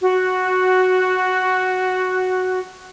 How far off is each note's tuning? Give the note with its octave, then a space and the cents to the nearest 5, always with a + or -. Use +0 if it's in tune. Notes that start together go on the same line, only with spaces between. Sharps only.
F#4 +0